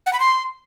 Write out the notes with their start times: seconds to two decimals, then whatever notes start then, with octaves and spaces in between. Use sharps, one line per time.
0.06 F#5
0.13 B5
0.20 C6